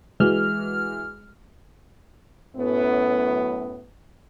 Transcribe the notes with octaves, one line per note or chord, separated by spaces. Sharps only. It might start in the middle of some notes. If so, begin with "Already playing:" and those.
E3 G#3 F#4 F6
F#2 A2 B3